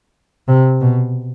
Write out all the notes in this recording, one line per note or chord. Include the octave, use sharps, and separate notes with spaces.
C3
B2